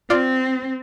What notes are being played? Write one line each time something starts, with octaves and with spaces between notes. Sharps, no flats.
C4 F4 D5